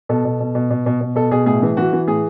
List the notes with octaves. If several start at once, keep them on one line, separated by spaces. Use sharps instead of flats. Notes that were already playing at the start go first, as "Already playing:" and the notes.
B2 A4
B2
B2
B2
B2
B2
B2
B2 A4
B2 G#4
A2 G#4
E3
E3 F#4
E3
A2 G#4